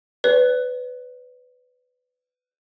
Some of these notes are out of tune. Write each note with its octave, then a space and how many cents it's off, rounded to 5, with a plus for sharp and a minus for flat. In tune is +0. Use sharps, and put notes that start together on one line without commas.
B4 +20 D5 -40